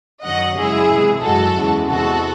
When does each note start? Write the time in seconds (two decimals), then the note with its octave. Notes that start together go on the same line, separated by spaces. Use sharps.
0.24 F#2 D#3 F#3 D#5 F#5
0.56 F#2 C#3 G#3 E4 G#4
0.90 C3 E3 G#3
1.23 F#2 E3 G#3 F#4 A4
1.56 E2 C#3 E3 G#3
1.88 E2 C3 E3 G#3 F#4 A4